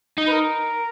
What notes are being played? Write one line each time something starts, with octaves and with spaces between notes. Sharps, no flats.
D#4
B4
A#4